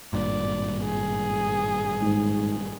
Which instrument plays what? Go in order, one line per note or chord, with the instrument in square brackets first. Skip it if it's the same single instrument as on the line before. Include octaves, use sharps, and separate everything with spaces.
[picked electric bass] G#1 G2 A#2 [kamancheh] D5
[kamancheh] G#4
[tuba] G#2